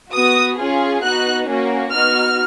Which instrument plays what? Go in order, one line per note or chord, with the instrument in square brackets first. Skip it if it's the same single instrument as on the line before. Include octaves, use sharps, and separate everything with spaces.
[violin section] B3 F#4 D#6
C#4 F4 G#4
B3 D#4 F#4 F#6
A#3 C#4 F#4
B3 D#4 F#4 F6